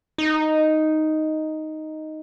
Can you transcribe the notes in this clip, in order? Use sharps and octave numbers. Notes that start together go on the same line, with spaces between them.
D#4